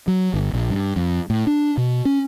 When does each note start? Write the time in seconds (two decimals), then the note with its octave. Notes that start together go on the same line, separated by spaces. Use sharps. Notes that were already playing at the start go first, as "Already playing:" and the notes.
0.08 F#3
0.34 G1
0.53 A#1
0.70 G2
0.96 F2
1.30 A2
1.47 D4
1.77 B2
2.05 C#4